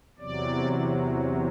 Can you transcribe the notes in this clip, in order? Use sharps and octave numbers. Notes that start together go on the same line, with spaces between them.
E2 C3 F#3 D5